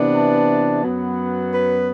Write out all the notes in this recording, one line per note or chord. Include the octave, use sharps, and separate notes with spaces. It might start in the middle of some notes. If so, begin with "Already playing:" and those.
Already playing: C3 E3 B3 D4
A5
F#2 F#3 B3
B4